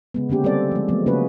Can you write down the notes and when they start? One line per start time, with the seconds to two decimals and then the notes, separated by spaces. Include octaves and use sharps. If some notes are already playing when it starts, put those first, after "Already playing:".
0.14 C#3 G#3 B3
0.29 D3 A#3 C#4 G4
0.44 G3 C4 A4 D5
0.72 F3 G#3
0.88 F3 F#3 G#3 A3 B3
1.06 C#3 A#3 C#4 F#4 G#4 B4